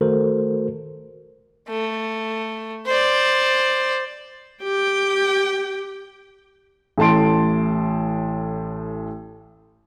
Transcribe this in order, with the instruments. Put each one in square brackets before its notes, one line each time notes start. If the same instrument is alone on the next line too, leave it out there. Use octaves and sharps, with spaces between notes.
[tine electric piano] D#3 A3 F#4 A4 A#4 C5
[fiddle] A3
C5 D5
[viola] G4 G5
[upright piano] A1 A2 A5 C6 D7